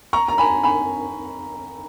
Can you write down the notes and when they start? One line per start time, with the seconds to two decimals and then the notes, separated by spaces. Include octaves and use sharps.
0.13 A#5 C#6
0.28 A#5
0.38 G#5 B5
0.63 G#5 B5